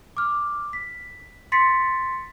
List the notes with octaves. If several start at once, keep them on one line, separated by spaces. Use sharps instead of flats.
D6 F6
B6
C6 A6 B6 C#7